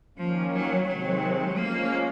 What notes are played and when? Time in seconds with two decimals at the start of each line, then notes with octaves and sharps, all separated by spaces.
0.17 D#3 F3 A#3 C#4
0.52 F#3
0.87 C3 D#3 F#3 G#3 C4
1.57 F3 G#3 A#3 C#4